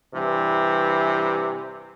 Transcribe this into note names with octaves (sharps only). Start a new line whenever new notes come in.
G2 C3 E3